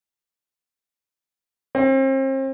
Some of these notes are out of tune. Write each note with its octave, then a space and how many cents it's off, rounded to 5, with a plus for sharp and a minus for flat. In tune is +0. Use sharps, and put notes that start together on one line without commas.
C4 +40